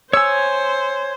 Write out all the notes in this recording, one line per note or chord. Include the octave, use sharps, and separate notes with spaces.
C5 C#5 G#5 E6